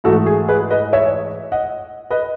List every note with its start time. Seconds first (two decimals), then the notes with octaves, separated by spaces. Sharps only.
0.04 G#2 E3 A3 F#4 A4
0.26 G#4
0.48 G#4 B4
0.70 B4 D#5
0.93 C#5 E5
1.52 D#5 F#5
2.10 B4 D#5